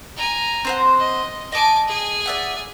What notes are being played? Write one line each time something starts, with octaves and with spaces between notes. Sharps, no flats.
G#5 A#5
C4 C5 F#5
D#5
D#5 G#5 A5 D6
G#4 G#5
D5 E5 F#5